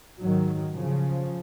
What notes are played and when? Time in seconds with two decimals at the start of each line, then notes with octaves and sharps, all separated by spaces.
0.20 G#2 D#3 F#3
0.75 C#3 F3